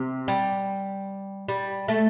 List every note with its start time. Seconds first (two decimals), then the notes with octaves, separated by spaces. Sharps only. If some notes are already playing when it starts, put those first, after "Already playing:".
Already playing: C3
0.28 G3
1.48 G3
1.88 A3